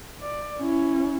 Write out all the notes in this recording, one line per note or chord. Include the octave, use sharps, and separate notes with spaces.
D5
C#4 E4